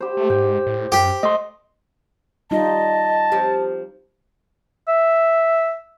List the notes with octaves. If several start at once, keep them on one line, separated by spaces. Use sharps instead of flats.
G4 C5
A3
G#2 G5
A2
F#2 G4
A3 D#5 C6
G3 D#4 F4 D#5 A5
F3 C4 G4
E5